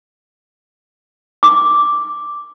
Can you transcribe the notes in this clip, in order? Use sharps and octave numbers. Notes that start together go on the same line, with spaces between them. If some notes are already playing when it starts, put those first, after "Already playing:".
D6